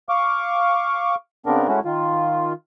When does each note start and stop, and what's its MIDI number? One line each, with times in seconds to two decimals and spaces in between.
0.09 1.15 77
0.09 1.15 85
0.09 1.15 86
1.46 1.67 49
1.46 1.67 59
1.46 1.67 60
1.46 1.67 62
1.46 1.67 70
1.68 1.80 56
1.68 1.80 57
1.68 1.80 61
1.68 1.80 64
1.68 1.80 66
1.85 2.53 51
1.85 2.53 65